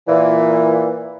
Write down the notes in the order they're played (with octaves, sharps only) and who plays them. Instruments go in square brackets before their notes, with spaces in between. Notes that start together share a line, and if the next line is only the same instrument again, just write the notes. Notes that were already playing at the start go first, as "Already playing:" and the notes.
[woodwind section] A#2 E3